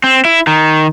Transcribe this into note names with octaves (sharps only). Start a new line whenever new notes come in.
C4
E4
D#3